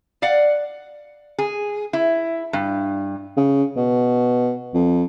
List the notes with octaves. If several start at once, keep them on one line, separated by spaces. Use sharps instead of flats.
D5 F5 F#5
G#4
E4
G2
C#3
B2
F2